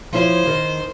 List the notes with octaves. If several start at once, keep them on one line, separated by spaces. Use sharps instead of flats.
F3 E4 C5 C#5
D#3